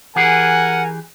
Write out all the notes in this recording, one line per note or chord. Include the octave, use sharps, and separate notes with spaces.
E3 G4 G#4 A#4 F#5 G#5